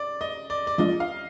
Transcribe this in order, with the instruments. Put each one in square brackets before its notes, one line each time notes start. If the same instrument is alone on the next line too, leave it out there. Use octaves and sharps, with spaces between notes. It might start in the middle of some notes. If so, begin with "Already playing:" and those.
Already playing: [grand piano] D5
D#5
D5
D5
[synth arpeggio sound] F3 G#3 D4 F4 [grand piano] D#5
[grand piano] F5